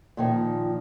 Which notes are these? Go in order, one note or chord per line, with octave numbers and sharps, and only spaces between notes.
A#2 D#3 F3